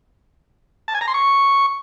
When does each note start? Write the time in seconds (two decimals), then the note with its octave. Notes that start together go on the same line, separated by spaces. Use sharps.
0.88 A5
0.95 G#5
1.01 A#5
1.08 C6
1.14 C#6